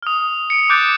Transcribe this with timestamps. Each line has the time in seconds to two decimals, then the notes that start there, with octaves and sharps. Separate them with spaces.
0.02 D#6 F6
0.50 C#7 D7
0.69 D6 F#6 G6 A6 D7